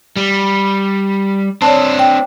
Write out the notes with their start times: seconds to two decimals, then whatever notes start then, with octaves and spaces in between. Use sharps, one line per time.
0.16 G3
1.62 C4 D4 C#5 D5 A5
1.99 G5